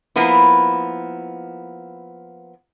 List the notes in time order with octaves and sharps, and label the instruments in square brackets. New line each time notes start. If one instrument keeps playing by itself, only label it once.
[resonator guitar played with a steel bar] F3 A#3 B3 E4